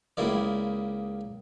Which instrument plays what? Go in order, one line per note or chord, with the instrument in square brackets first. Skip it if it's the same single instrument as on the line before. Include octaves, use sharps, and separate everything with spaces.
[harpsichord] C#2 C#3 A#3 E4 D5